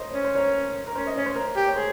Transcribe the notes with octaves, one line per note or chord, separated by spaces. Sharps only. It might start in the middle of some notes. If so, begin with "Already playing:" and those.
Already playing: A#4 C5 C#5 D#5
C#4 C#5
C5
A#4 C#5
A#4
C#4 C5
D#5
C#4 C#5
C5
A#4
G4
C#5
G#4 C5